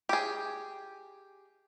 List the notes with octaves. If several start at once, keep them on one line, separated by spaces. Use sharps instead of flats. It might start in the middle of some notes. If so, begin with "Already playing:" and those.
G4 G#4